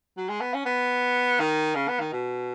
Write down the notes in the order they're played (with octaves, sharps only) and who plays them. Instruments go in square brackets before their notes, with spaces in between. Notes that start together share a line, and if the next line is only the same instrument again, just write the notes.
[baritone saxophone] F#3
G#3
B3
C#4
B3
D#3
C#3
B3
D#3
B2